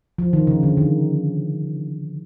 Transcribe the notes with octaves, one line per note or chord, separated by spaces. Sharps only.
F3
D#3
C#3
D3
D#3